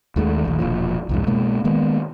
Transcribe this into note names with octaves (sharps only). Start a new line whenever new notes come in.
D#2 D#3 G#3 A3
A#1 D#2
E1 A#2 F3
C2 F2 G#2
B2 G#3 A#3
D#3 G#3 A#3 B3